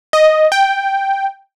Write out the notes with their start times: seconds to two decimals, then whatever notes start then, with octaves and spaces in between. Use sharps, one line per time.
0.13 D#5
0.52 G5